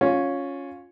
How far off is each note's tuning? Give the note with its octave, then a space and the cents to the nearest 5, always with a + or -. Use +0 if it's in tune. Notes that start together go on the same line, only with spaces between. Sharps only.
C#4 +0 F4 +20